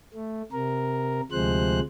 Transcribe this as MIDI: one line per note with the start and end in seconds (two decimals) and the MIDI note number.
0.14 0.42 57
0.52 1.21 48
0.52 1.21 70
1.32 1.80 38
1.32 1.80 48
1.32 1.80 53
1.32 1.80 56
1.32 1.80 72
1.32 1.80 90